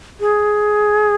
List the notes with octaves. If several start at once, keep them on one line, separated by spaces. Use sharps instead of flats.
G#4